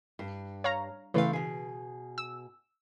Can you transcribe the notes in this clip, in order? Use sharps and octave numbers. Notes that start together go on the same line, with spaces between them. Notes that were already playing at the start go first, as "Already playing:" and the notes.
G2
C#5 F5 A#5
C#3 E3 A3 C4 B4 F5
B2 G#4
E6